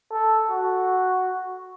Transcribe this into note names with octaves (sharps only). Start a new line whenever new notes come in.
A4
F#4